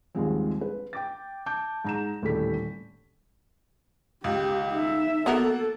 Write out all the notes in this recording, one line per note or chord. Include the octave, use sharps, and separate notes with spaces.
D#2 G#2 F3 G3 G#3 C4
B4
G5 D6 A6
A5 D6 G6
G#2 A#5 E7
D#1 A2 D3 G3 A4 B6
C#2 G4
D#4 E5
A#3 B3 F#4 A4 A#4 F#5